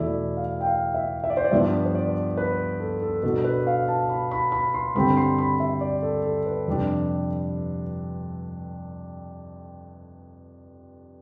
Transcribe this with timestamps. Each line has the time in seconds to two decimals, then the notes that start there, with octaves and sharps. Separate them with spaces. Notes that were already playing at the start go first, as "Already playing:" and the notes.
Already playing: E2 B2 A3 E4 D5
0.37 F5
0.61 G5
0.66 F5
0.94 E5
1.24 E5
1.30 D5
1.37 C5
1.44 D5
1.51 G2 F3 B3 D4 E5
1.85 C5
1.95 D5
2.37 B4
2.80 A4
3.02 A4
3.23 B2 B3 D4 A4
3.44 B4
3.67 F5
3.88 A5
4.10 B5
4.31 B5
4.52 B5
4.74 C6
4.95 G2 D3 G3 C4 B5
5.17 C6
5.38 B5
5.60 E5
5.81 D5
6.02 A4
6.24 A4
6.46 B4
6.68 F2 C3 G3 D4